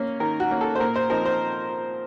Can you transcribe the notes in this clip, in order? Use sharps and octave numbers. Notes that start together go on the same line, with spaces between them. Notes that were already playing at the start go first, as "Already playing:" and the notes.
Already playing: A#3 C#4
D#3 A#4
F#4
A#3 C#4
A4
C5
A#2 A#4
C5
F3 C4 D#4 A#4
C5